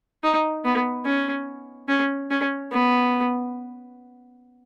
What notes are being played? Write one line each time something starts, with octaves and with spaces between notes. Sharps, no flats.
D#4
B3
C#4
C#4
C#4
B3